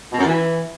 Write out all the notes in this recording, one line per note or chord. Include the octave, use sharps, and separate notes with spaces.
B2
F#2
E3